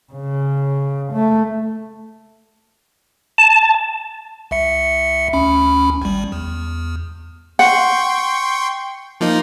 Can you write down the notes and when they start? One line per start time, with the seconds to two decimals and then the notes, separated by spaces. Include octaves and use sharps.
0.13 C#3
1.13 A3
3.38 A5
4.51 C2 E5 C#7
5.33 D2 C#4 B5
6.02 G#1 G3
6.32 E2
7.59 F#5 G5 C6 C#6
9.21 F3 A#3 D#4